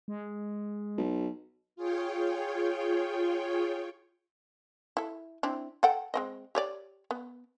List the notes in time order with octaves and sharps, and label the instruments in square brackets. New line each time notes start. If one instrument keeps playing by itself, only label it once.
[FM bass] G#3
[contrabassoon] B1
[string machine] F4 G#4 C#5 G5
[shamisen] E4 A4
C4 D4 E4
A4 F#5 G5
G#3 C4 D#5
G4 C#5 D5
B3